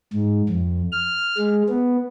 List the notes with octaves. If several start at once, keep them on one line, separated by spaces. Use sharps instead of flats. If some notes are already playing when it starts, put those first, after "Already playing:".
G#2
F2
F6
G#3
B3